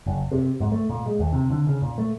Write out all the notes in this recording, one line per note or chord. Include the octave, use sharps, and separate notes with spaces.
F#1
C3
G#2
A3
A#2
G#3
D#2
C3
D3
C#3
A#2
A3